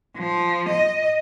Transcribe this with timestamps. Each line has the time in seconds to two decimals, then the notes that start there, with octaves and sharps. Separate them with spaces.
0.18 F3
0.69 D#5